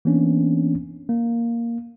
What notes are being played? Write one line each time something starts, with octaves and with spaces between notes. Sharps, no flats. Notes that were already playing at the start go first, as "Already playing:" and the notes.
E3 A#3 B3 C#4 D4
A#3